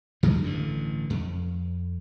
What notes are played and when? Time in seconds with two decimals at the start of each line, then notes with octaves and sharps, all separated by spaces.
0.23 F#2 D3 D#3 G#3
0.44 A1 G2 D3
1.10 F2